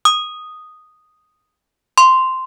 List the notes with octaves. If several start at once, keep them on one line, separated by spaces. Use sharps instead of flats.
D#6
C6